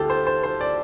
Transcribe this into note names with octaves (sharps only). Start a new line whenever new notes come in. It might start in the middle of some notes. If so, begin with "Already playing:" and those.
Already playing: D2 D3 F4 G4 A4
C5
C5
C5
D5